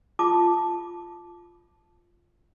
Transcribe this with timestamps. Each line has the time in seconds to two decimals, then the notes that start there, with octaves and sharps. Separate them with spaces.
0.19 F4 A5 D6